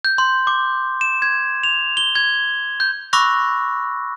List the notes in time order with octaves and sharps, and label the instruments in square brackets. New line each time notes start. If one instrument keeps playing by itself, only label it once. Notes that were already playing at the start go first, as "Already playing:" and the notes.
[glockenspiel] G6
C6
D6
E7
G#6
F7
G7
G#6
G6
B5 C#6 D6 E6 F#6 A#6